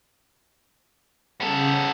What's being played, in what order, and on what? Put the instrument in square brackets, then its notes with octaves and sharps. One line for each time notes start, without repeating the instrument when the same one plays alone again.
[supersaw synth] C#3 [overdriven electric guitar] B3 A4